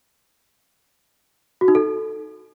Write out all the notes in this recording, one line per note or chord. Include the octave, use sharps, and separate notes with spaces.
F#4
D#4
A4